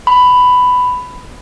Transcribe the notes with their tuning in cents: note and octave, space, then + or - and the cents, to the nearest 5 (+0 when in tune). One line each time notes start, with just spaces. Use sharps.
B5 +10